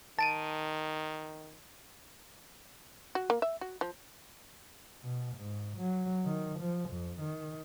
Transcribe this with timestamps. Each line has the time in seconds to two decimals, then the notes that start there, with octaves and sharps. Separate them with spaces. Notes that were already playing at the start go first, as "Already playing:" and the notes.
0.19 D#3 A5 D7 D#7
3.15 F#4
3.30 A#3
3.42 E5
3.61 F#4
3.81 F3
5.03 B2
5.36 G#2
5.77 F#3
6.25 D#3
6.59 F3
6.89 F2
7.20 D#3